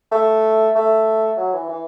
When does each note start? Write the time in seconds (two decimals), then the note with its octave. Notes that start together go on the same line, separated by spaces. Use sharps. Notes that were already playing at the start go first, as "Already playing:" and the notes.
0.12 A3
0.75 A3
1.37 F#3
1.53 E3
1.68 E3